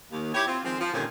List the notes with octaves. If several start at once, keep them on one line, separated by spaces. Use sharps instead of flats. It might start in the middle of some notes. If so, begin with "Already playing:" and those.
D#2
E4 G4 C#5
C4 F4
D#3 F3 G#3 C4
F3
G2 A#2 D3 D#3 C4 C#4